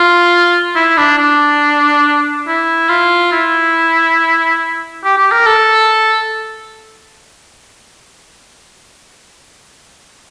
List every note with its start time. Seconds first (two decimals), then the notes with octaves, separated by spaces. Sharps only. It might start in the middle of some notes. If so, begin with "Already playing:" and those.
Already playing: F4
0.75 E4
0.97 D4
1.18 D4
2.47 E4
2.89 F4
3.32 E4
5.04 G4
5.18 G4
5.32 A#4
5.46 A4